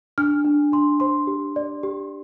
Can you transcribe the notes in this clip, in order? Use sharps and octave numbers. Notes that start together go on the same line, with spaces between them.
D4 F6
D4
D4 C6
C5 C6
G4
D5
G4